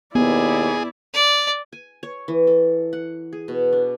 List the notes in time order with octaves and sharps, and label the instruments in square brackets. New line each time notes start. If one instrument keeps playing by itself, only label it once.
[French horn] D#2 [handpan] B3 [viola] E4 D5 [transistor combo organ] G#4
[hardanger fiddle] D5
[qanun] G#5
C#5
E3
A4
F#5
G#4
B2
D4